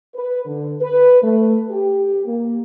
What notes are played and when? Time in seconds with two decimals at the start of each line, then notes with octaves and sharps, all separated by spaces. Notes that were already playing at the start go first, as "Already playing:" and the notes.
0.15 B4
0.46 D3
0.81 B4
1.22 A3
1.70 G4
2.26 A#3